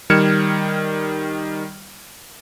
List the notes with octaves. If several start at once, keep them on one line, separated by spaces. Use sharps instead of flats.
D#3 G3 F6 G#6 C#7 E7